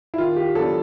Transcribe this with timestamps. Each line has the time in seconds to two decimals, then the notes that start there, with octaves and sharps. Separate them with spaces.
0.14 E4
0.18 D#3 F4
0.36 G4
0.55 F#3 B3 D4 A4